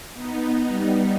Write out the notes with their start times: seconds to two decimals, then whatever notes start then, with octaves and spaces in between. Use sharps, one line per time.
0.13 B3 D#4
0.67 G3 B3